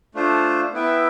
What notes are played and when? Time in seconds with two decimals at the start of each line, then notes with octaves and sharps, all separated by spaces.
0.15 A3 D4 F4 C5
0.73 B3 E4 B4 E5 G5